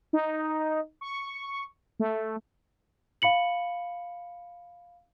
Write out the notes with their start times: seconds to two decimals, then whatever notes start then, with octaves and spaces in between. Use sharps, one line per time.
0.13 D#4
1.01 C#6
2.00 A3
3.22 F5 B5 C#7 F#7